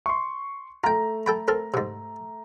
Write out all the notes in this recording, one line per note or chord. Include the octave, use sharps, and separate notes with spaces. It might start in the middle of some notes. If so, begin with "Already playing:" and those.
C6 C#6
A3 F4 G5 A#5
A4 G5 B5
C4 A4 A#4
G#2 C3